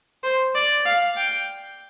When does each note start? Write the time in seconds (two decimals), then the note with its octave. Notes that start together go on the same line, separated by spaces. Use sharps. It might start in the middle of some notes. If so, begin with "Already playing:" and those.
0.23 C5
0.55 D5
0.86 F5
1.16 G5